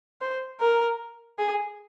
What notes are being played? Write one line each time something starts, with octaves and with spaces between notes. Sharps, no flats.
C5
A#4
G#4